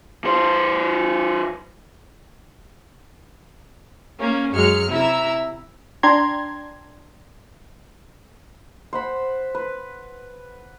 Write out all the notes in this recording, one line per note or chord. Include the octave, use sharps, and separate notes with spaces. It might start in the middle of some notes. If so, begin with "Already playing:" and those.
E3 C5
A#3 C#4
F#2 F#3 G#3 F6 C#7
C3 E4 E5 A#5 E6
D4 G5 A#5 C6 G#6
C5 F#5 B5
B4